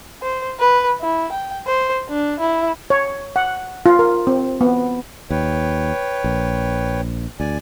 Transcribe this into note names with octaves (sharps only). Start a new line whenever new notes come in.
C5
B4
E4
G5
C5
D4
E4
C#5
F#5
F4
A#4
C4
B3
D#2 B4 C#5 G5
A#1
D2 D5 G#5